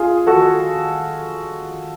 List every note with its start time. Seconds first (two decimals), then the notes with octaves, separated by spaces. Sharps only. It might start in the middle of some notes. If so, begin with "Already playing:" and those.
Already playing: F4 G#4
0.27 F#4 A4